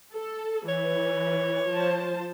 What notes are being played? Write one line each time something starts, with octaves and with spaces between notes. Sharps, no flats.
A4
E3 C#5
F3 C5 A5